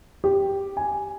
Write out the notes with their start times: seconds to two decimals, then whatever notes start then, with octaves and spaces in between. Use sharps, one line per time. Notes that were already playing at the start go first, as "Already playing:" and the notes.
0.24 G4
0.77 G#5